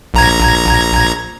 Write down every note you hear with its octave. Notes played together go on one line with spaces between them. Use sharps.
A#1 A#5 G#6